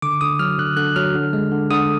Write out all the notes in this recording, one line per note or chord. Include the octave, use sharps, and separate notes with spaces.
D3 D6
D3 D#6
F#3 F6
D3 F#6
D3 F#6
F#3 F6
D3
G#3
D3
D3 D#6